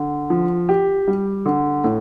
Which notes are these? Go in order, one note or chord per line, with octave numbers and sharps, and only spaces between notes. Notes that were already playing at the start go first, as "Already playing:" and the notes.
Already playing: D3
F3
G4
G3
D3
A2